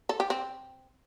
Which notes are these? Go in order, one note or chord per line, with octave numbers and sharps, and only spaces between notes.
A4
G4
C4